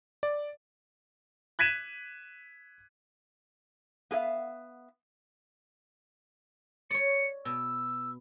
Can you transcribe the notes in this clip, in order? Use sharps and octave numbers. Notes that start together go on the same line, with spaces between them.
D5
F#6 G#6 B6 D#7 E7
B3 G#4 A#4 E5 F5
C#5 D5 C#7
B2 E6